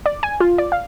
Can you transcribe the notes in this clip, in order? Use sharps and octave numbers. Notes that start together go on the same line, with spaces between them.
D5
G#5
F4
D5
F5